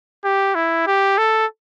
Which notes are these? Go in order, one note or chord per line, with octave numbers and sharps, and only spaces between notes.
G4
E4
G4
A4